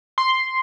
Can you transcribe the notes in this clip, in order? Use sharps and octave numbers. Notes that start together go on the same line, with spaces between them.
C6